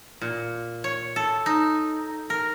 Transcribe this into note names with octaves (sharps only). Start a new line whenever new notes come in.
A#2
C#5
A4
D#4
A#4